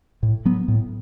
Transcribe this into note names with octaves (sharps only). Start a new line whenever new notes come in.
A2
F#3 B3
A2